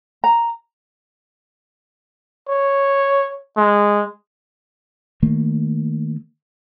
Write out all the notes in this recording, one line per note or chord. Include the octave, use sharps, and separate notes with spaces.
A#5
C#5
G#3
D#3 A3 A#3